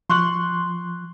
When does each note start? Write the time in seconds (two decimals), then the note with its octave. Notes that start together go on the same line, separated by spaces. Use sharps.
0.10 F3 C6 C#6 F#6 F#7